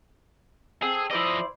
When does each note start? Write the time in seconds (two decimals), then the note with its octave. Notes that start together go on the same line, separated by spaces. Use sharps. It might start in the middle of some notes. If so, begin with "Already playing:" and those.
0.82 C4 G#4 A4
1.11 F3 E4 C5 D5 D#5